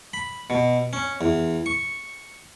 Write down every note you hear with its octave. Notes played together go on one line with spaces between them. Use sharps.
B5
B2
C#4
E2
C#6